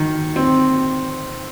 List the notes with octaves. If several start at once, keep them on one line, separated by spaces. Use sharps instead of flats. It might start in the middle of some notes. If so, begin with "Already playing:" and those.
Already playing: D#3
C4